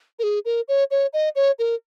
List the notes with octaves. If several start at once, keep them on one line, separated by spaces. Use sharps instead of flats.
A#4
G#4
A#4
C#5
C#5
D#5
C#5
A#4